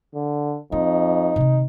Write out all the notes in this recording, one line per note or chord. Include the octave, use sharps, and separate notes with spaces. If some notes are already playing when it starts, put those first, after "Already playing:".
D3
F2 C4 D#4
C3 D#3